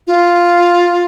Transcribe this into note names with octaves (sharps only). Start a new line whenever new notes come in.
F4